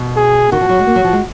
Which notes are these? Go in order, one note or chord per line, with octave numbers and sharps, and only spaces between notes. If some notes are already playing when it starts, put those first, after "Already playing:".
Already playing: B2
G#4
D#3 F#4
F3
F#3
G#3
A#3
F#3
F3
G#3